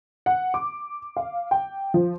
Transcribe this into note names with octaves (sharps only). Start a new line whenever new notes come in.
F#5
D6
F5
G5
F3